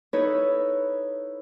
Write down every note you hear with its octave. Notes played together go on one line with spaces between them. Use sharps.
D#4 E4 A4 B4 C#5